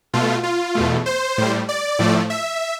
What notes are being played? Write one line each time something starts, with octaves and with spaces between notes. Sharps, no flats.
B2 A3 F4
F4
E2 B2 A3
C5
A2 G3
D5
A2 F3 A3
E5